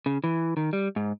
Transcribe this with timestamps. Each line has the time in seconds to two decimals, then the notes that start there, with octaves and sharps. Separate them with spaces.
0.06 C#3
0.24 E3
0.57 D#3
0.73 G3
0.96 G#2